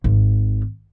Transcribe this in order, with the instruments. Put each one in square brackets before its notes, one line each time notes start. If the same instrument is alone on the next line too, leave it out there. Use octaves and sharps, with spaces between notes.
[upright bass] G#1